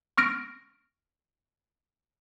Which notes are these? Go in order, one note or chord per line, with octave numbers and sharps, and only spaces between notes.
C#6 F6 A#6 D7